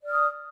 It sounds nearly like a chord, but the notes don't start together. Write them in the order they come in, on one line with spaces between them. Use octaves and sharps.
D5 F6 D#6